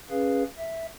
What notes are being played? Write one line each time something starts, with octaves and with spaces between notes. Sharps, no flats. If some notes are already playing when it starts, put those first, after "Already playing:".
C#4 G#4 B4 F5
E5